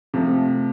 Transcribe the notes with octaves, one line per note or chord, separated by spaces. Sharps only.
C3 F3 A3